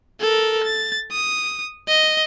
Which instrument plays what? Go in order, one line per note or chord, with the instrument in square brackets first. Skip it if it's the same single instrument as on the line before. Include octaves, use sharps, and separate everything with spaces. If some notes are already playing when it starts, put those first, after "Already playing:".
[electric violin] A4 A#4
A6
D#6
D#5